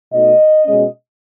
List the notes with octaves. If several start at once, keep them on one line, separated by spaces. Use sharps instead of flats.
B2 A3 D#4 D#5
B2 G#3 C#4